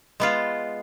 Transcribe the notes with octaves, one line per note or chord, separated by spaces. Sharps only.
G#3 B3 F4